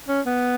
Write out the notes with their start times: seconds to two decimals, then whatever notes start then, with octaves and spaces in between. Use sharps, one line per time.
0.09 C#4
0.26 B3